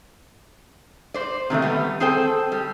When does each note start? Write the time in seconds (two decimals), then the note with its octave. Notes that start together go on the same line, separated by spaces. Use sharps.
1.14 C5 D5
1.50 C3 D#3 G#3 A3
1.62 G3 B3
2.00 C4 G#4 A4 C5 G5
2.52 G3